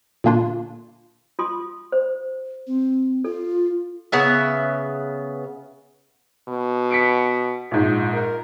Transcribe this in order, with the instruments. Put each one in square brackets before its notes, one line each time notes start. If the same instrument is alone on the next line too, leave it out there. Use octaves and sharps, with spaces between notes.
[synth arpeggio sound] A#2 D3 A#3 D4 F4 C6
[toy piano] F4 C6 D#6
C5
[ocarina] C4
[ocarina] F4 [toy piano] A4
[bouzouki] C#3 B3 E5
[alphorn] B2
[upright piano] B6 C#7 D7
A#1 G#2
[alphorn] A#4